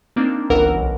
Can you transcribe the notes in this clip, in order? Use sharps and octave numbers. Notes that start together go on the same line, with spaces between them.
A#3 C4 D4 D#4
G1 C#2 E3 A#4 F#5 E6
B1